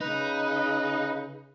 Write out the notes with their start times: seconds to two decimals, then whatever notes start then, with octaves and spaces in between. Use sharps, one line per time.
0.01 C#3 D#4 B4